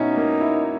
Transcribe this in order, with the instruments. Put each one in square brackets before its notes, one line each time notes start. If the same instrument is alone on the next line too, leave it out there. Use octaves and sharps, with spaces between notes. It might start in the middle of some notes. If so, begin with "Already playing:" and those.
Already playing: [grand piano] B2 C#4 E4 [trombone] D#4
[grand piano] A#3
E4